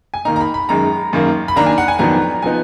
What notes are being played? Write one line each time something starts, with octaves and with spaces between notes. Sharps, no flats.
G#5
D#3 A#3 D#4 A#5
A#5
B5
B5
F#2 D#3 G#3 A#5
F#2 D#3 A#3
B5
D#3 A#3 D4 A#5
G#5
F#5
G#5
F2 D#3 F#3 B3 D4 A#5
F3 B3 D#4 G#5